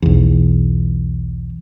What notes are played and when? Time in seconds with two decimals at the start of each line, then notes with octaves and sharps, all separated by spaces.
0.02 B1 E2